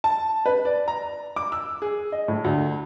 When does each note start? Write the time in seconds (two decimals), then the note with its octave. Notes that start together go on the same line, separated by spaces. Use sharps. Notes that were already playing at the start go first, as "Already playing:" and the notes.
0.04 A5
0.46 B4
0.65 D5
0.88 A#5
1.36 D6
1.52 E6
1.82 G#4
2.12 D#5
2.28 A2
2.44 D2